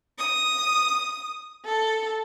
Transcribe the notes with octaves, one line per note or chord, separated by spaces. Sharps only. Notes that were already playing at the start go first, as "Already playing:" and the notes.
D#6
A4